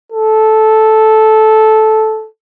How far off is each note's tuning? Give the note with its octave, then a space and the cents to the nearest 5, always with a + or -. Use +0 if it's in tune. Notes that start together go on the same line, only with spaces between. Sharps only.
A4 -10